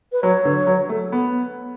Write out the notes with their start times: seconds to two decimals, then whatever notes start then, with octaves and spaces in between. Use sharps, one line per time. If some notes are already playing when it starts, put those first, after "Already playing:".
0.12 B4
0.23 F#3 C#5
0.45 D3
0.67 F#3
0.89 A3
1.12 B3